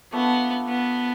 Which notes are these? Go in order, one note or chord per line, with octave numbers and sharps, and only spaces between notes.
A3 B3 D4 F4 B4
B3